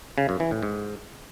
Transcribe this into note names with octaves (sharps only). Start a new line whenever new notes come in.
C#3
F#2
E3
A2
G#2